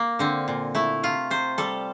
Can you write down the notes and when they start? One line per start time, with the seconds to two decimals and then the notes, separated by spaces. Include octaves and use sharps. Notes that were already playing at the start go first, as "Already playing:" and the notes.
Already playing: A#3
0.19 D3 C4
0.48 A#2
0.75 A3 E4
1.03 C3 F4
1.30 C3 C5
1.58 G3 A4